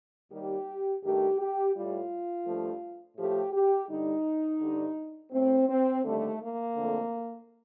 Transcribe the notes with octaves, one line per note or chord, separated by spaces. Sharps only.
D#2 D#3 G3 G4
G2 D#3 A3 G4
G4
A2 G3 F4
G2 F3 A3
A2 F3 A3 G4
G4
G2 D3 G3 D#4
G2 D3 G3
A2 A3 C4
C4
D#2 D3 G3 A3
A#3
F2 D3 A3